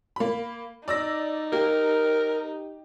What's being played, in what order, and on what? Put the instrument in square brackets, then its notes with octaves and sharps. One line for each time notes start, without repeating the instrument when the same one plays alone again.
[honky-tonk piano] A#3 B5
[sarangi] D#4 [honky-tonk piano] D5 E6 A#6
[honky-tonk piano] G4 [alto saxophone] A#4